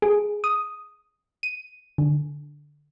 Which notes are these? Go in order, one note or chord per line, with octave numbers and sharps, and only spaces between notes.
G#4
D#6
D#7
D3